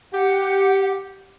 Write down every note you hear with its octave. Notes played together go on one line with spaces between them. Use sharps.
G4 F#5